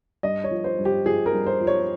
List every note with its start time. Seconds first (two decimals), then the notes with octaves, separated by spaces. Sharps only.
0.23 G2 D#5
0.44 C#5
0.51 F3
0.64 C5
0.79 G2
0.85 G4
1.06 F3 G#4
1.26 A#4
1.33 G2
1.47 C5
1.61 F3
1.67 C#5